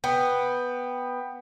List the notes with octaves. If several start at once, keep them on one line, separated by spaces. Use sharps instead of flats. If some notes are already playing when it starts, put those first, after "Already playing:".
B3 G5